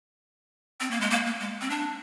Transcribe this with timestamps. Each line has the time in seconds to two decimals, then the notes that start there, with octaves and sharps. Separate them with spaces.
0.80 C4
0.91 A#3
1.01 G#3
1.10 A#3
1.26 A#3
1.40 G#3
1.61 C4
1.70 D4